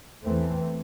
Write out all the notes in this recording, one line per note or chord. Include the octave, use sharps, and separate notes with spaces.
E2 E3 A3 C4